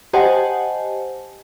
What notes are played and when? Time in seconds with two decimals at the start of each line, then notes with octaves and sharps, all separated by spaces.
0.13 G4 C5 D#5 F#5 G#5 A5